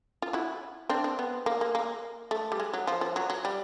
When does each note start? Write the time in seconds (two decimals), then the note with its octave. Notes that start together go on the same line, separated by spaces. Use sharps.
0.22 F4
0.33 E4 F#4
0.89 C4 D4
1.04 C4
1.19 B3
1.46 A#3
1.61 A#3
1.75 A#3
2.31 A3
2.52 G3
2.60 G#3
2.74 F#3
2.87 F3
3.01 F3
3.16 F#3
3.30 F#3
3.45 G3